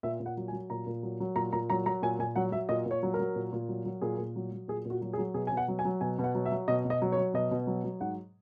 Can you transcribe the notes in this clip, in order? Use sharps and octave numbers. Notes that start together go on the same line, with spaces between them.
A#2 E5
A#2
F#5
F#3
G#5
F#3
A#2 A#5
A#2
F#3
F#3
A#2 A#5
A#2 A#5
F#3 A#5
F#3 A#5
A#2 G#5
A#2 G#5
F#3 F#5
F#3 E5
A#2 D#5
A#2 C#5
F#3
F#3 A#4
A#2
A#2
F#3
F#3
A#2 G#4
A#2
F#3
F#3
A#2 G#4
A#2 F#4
F#3
G#4
F#3
B2 G#4
B2 G#5
F#5
F#3
G#5
F#3
B2 G#5
B2
F#5
F#3
E5
F#3
B2 D#5
B2
D#5
F#3
C#5
F#3
B2 D#5
B2
F#3
F#3
G#2 F#5